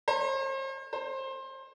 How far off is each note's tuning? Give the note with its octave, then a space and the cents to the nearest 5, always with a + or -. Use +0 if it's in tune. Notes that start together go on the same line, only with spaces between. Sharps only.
C5 +45
C5 +25